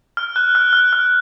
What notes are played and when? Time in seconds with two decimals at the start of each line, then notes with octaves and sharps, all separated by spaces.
0.17 F6
0.36 F#6
0.55 F6
0.73 F6
0.93 F6